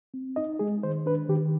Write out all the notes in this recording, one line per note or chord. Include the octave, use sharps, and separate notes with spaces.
C4
D#4 D#5
G#3 G#4
D#3 C5
D4 B4
D#3 G4